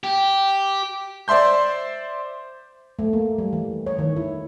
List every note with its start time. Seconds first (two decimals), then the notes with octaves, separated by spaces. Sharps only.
0.04 G4
1.28 C5 D5 E5 C6 G6
2.99 A3
3.13 A#3
3.38 G3
3.53 E3
3.86 C#5
3.99 D#3
4.16 E4